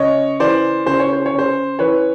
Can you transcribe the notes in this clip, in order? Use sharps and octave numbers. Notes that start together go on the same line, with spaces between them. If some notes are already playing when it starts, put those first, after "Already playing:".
Already playing: C#3 C#5 D#5
E3 C5 D5
C#3 C5
C#5
C5
C#5
C#3
C5
E3 B4 C#5